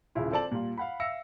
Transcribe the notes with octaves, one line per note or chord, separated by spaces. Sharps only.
D#1 C#3 E4 F4
C4 A4 D5 A5 F#7
A#2 G3 F4
F5 F#5 B5
E5 F5 E6 A#6 C#7